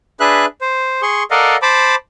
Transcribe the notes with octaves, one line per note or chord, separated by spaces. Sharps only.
D4 G#4 B4 E5 F#6
C5
G#4 C6 C#6
A4 A#4 D5 D#5 F5 F#5
C5 A5 B5 D6